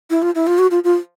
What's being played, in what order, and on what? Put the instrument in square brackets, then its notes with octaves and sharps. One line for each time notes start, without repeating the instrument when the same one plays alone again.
[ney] E4
F4
E4
F4
F#4
F4
F4